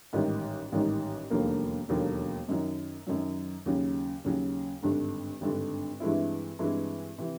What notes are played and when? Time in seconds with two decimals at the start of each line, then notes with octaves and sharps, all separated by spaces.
0.13 A1 G#2 D#3 G3
0.72 A1 G#2 D#3 G3
1.30 E1 D#2 D3 F#3 A#3
1.89 E1 D#2 D3 F#3 A#3
2.48 F#2 D#3 F#3
3.07 F#2 D#3 F#3
3.66 D#2 C#3 F#3
4.24 D#2 C#3 F#3
4.82 G#1 G2 D3
5.41 G#1 G2 D3
6.00 G2 E3 G#3 C4 E4
6.59 G2 E3 G#3 C4 E4
7.18 C3 E3